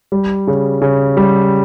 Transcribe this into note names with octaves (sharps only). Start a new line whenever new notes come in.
G3
C#3
C#3
G3